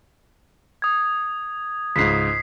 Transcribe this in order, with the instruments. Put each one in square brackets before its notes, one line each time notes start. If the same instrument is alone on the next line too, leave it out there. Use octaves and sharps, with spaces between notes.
[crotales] D#6 G#6
[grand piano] C#2 G#2 [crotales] B6 C7